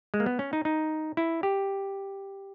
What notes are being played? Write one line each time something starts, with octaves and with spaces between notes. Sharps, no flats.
G#3
A#3
B3
C#4
D#4
D#4
E4
G4